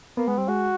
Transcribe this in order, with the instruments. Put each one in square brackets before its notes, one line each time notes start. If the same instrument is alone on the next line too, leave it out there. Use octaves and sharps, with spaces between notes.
[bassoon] A#3 [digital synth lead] B3
[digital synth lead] G#3 [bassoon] B3
[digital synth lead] G3 [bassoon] C4
[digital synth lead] G#3 [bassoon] F#4